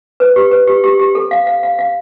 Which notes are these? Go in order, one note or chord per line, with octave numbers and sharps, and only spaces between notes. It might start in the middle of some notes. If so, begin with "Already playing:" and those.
B4
G4
B4
G4
G4
G4
A4
F5
F5
F5
F5